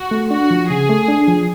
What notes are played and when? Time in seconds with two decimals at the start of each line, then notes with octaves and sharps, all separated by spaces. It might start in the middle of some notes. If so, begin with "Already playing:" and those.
Already playing: F#4
0.11 A3
0.30 D4 F#4
0.50 F3
0.69 C#3 G#4
0.89 A3
1.08 D4
1.28 F3